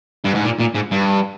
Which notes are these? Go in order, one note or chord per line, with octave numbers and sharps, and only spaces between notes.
G2
G#2
A#2
A#2
G#2
G2